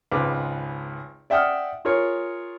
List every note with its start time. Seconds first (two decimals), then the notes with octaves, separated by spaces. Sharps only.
0.11 G#1 C#2 B4 D6
1.30 D5 E5 F#5 G5 D#6 F6
1.85 F4 G#4 A#4 C#5